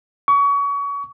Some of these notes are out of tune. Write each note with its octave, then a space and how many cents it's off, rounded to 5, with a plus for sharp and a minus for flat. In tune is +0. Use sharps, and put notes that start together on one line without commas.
C#6 +30